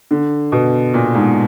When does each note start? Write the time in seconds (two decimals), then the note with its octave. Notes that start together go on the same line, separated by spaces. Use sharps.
0.11 D3
0.52 B2
0.94 A#2
1.15 G#2